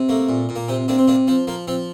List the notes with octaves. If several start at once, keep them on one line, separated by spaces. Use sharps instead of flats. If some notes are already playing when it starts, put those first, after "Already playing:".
Already playing: C3
A3 A#3
A#2
A#2
A#3
C3 C4
C3 A#3 D4
C4
C3 A#3 D4
F3 C4
F3 A#3
F3 C4